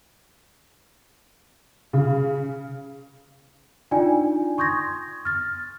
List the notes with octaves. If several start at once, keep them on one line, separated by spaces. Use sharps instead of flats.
C#3
D4 D#4 F4 D5 G5 G#5
C6 C#6 D#6 G6 G#6 A#6
F6 A6